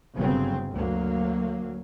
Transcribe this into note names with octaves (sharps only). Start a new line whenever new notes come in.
G1 C#3 F#3 C4
D2 F#3 A#3